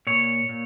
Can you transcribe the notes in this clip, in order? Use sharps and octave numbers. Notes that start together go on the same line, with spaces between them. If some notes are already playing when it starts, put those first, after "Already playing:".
A#2 C#5
A#2